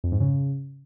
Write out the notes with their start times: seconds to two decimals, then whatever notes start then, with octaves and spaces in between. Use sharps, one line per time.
0.04 F2
0.12 G#2
0.20 C#3